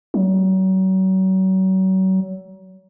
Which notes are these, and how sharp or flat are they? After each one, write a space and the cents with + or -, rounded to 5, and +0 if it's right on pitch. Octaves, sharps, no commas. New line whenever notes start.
F#3 +35